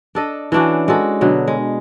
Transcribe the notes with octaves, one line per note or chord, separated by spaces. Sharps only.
D4 A4 D#5
E3 C#4 D4 F#4
G#3 F#4 A4
B2 D3 F#3
G#3